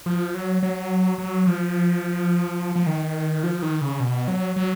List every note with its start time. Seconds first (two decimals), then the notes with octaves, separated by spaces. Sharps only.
0.06 F3
0.34 F#3
0.63 F#3
1.18 F#3
1.47 F3
2.76 F3
2.87 D#3
3.43 F3
3.62 D#3
3.81 C#3
4.00 B2
4.28 F#3
4.56 F#3